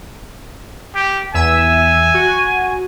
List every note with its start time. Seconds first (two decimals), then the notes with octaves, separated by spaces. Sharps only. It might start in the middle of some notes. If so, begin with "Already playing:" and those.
0.95 G4
1.34 E2 E5 G#5 E6
2.14 F#4